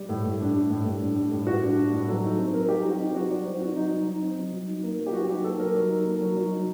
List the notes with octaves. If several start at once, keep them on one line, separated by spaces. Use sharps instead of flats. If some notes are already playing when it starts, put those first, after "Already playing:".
Already playing: G3
A2
A2
D4
G3
A2
A2
D4
G3
A2
A2 F#4
D4
G3
A2
F#3 A4
D#4
C4
F#3 A#4
F#3 G4
D#4 F#4
C4 D#4
F#3 F#4
F#3 D5
D#4 C5
C4 F#4
F#3 D#4
F#3
D#4
C4
F#3
F#3
D#4
A#3
F#3
G4
F#3 F#4
D#4 G4
A#3 A4
F#3 A#4
F#3
D#4
A#3
F#3
F#3
D#4